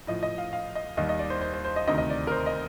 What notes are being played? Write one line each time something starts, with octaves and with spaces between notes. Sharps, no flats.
A2 F3 D#5
D#5
F5
F5
D#5
D#2 D#3 G3 D#5
D#5
D5
C5
C5
C5
C5
D#5
D2 C3 D#3 D#5
D#5
D5
A#4
C5
D#5